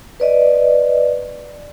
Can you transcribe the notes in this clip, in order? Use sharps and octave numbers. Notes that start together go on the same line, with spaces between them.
B4 D5 D#5